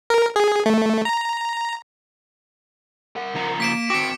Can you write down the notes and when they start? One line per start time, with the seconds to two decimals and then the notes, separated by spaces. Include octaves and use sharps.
0.10 A#4
0.36 G#4
0.66 A3
1.05 A#5
3.16 A#4 F#5
3.35 C#3 F3 A#5
3.60 A#3 B6 D7 E7
3.90 C4 F#4 G5 D6 C#7